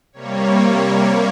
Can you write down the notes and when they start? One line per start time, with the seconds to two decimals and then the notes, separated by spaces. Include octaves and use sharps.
0.13 C3 G3 A#3 C#5